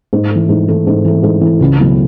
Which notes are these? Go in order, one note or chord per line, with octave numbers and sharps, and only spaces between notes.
G#2
E3 A3
G#2
E3 A3
G#2
E3 A3
G#2
E3
A3
C#2
B2 F#3 A3 E4